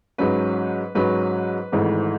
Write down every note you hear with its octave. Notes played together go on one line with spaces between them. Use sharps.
G#2 F#3 C#4 B4
G#2 F#3 C#4 B4
G#1 G#2 E3 A3